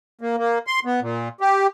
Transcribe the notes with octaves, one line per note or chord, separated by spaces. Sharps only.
A#3
A#3
C6
B3
A#2
G4